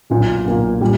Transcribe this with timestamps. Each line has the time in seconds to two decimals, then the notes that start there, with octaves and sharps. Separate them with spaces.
0.10 B1 A#2 A#3
0.46 B1 A#2 A#3
0.81 A#2 G3